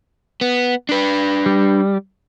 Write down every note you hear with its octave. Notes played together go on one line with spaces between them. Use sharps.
B3
D4 B4
G3